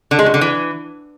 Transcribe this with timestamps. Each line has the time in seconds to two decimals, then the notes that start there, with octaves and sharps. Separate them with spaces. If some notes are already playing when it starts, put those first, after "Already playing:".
0.11 D3
0.19 G#3
0.26 F#3
0.34 D3
0.41 E3